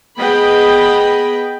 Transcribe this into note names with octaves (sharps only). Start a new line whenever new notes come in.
B3 G#4 D#5 G5 B5